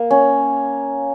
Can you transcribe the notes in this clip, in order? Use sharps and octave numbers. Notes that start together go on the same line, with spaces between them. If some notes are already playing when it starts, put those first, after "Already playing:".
Already playing: A#3
C#4